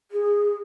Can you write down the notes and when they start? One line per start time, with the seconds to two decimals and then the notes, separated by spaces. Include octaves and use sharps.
0.12 G#4